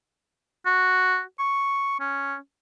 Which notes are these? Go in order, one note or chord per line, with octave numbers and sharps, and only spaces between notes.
F#4
C#6
C#4